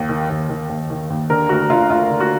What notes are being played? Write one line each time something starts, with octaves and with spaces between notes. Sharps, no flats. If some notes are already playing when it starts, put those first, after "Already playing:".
Already playing: D#2
D#3
D#2
D#3
D#2
D#3
D#2
D3 A#4
D2 F#4
D3 F4
D2 F4
D3
F#4